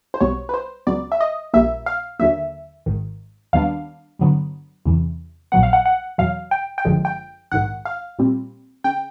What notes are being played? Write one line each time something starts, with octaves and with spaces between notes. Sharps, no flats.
C5
B1 B2 G3 B3 C#5
B4
C5
C#2 C#3 F#3 B3 D5
E5
D#5
A#1 A#2 G3 A#3 E5
F5
D#2 D3 F#3 A#3 E5
G#1 G#2 D#3
D#2 D#3 G3 B3 D4 F5
G2 D3 F#3 B3
E2 C3 E3
A#1 A#2 F#3 B3 F#5
F5
F#5
F#5
E2 B2 F#3 F5
G5
G5
G1 F#2 D3 F3 G#3
G5
A#1 G#2 D#3 F#5
F5
A#2 G3 C4
C#3 G5